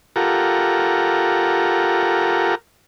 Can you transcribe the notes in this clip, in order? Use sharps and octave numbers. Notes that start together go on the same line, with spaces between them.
F4 G4 A4 A#4 F#5 A#5